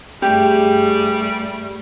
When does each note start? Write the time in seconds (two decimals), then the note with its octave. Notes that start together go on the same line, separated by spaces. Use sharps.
0.22 G2 G3 A3 G4 G#4